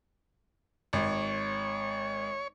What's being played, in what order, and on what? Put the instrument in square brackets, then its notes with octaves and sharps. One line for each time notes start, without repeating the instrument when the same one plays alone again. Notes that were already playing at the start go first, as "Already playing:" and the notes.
[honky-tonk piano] G#1 [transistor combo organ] C#5